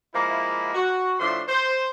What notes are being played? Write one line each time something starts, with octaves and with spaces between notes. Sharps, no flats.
F3 G#3 A#3 E4
F#4
A2 F3 D4 E5 C6
C5